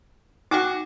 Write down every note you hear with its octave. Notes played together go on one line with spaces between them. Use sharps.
D#4 F#4 G5 D6